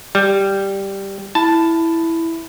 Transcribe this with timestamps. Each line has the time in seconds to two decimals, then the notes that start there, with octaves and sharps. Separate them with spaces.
0.15 G3
1.35 E4 A5